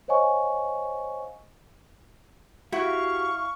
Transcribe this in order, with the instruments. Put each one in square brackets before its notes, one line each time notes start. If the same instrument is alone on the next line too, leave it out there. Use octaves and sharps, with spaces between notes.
[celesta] C5 C#5 D#5 F5 G#5 C#6
[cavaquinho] E4 [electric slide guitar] F#4 G4 F#5 [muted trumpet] F5 [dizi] C#6